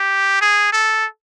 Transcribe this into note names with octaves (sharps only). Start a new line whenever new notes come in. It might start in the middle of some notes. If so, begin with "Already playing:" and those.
Already playing: G4
G#4
A4